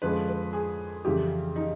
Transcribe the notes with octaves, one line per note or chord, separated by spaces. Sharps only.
F2 D3 F3 G#3 C#4 B4
B4
G#4
F2 C#3 E3 G3 G4
D#4